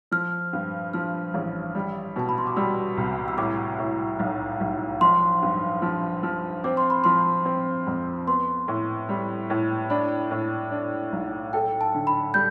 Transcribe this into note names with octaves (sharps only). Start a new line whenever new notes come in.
F3 F6
G2
F3 F6
A1
G3
B2 A5
B5
C6
D6
G3 E6
C2
E6
A2 D6
A2
B1
B1
F3 C6
G2
F3
F3
C4 D6
C6
B5
F3 C6
C4
F2
B3 C6
A2
G3
A2
D4 B5
A2
D4
B1
A4 G5
A5
D3
B5
G3 G6